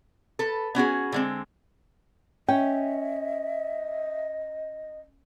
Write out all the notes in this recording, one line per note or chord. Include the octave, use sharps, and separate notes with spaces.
A4 B4
B3 C#4 F#4 G#4
D3 G#3 C4
C#4 D#5 E5 G5